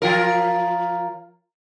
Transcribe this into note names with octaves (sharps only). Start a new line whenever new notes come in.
F3 F4 A#4